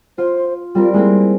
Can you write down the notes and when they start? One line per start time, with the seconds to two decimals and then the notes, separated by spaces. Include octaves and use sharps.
0.18 F4 C5
0.75 G3 C4 F4 A#4
0.94 G#3 A#3 C4 E4